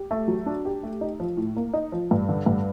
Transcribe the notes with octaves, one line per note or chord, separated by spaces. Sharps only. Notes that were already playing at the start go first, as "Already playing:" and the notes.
Already playing: G4
A3
F#3
D4
G4
A3
D#4
F3
A2
A#3
D#4
F3
G2
D3
G2